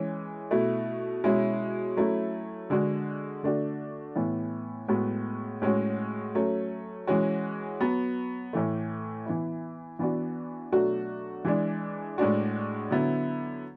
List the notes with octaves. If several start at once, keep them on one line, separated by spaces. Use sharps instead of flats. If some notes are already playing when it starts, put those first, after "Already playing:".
Already playing: E3 G#3 C#4
B2 A3 E4
B2 G#3 C#4 E4
F#3 A3 C#4 E4
D3 G#3 D4 F#4
D3 A3 D4 F#4
A2 E3 B3 E4
A2 G#3 B3 F#4
A2 G#3 C#4 F#4
F#3 A3 C#4
E3 G#3 C#4 F#4
F#3 B3 F#4
A2 E3 A3
E3 B3 E4
E3 B3 D4 F#4
B2 F#3 A3 D4 F#4
E3 G#3 D4
A2 G#3 D4 F#4
D3 F#3 B3 E4